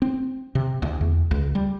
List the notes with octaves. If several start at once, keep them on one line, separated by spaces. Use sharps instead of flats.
C4
C3
D2
E2
C#2
G3